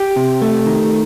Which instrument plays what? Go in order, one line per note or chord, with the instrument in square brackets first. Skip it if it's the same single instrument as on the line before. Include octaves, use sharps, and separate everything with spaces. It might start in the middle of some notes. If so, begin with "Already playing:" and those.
Already playing: [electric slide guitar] G4
C3
A3
D#3